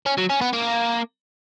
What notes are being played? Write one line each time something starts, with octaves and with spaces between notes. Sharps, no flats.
C#4
F#3
C#4
B3
A#3